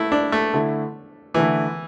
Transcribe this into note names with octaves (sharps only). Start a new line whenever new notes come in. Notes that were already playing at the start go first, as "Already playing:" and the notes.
Already playing: A3 E4
D4
A3
D3 A3 E4
D3 E3 A3 E4